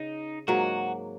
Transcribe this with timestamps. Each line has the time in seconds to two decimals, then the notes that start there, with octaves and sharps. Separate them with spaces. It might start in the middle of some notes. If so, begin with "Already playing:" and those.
Already playing: C#3 D#4
0.48 G#2 F#3 A#3 F#4